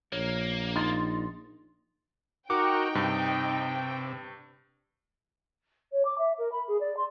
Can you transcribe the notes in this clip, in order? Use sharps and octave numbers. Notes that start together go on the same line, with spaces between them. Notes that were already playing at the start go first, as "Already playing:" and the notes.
A#1 A#3 C#5
D#4 C6 A6
D#4 F#4 A#4 G5 C#6 D6
G2 C3
C#5
D6
E5
A#4
B5
G#4
D5
C6